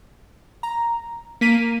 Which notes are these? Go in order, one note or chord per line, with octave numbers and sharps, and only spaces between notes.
A#5
A#3 B6 D#7